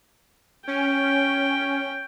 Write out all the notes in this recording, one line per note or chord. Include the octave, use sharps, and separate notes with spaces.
C#4 G5